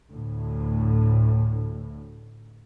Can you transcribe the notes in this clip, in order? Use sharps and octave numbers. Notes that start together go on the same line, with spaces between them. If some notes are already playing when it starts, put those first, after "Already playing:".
D2 A2